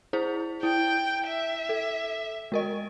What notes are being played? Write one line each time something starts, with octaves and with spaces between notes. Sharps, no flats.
E4 G#4 C5
E4 G5
E5
A4
G#3 A#4 D#5